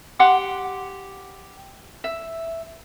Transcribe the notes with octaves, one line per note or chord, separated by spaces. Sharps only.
G4 F#5 C6 D6
E5